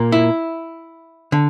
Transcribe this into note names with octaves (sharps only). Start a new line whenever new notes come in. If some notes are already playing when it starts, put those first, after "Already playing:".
Already playing: A#2 A#3
E4
D3